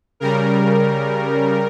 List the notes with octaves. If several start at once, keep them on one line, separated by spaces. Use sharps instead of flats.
C#3 G3 A#4